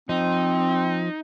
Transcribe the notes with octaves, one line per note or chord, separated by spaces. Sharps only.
F3 C4 D#4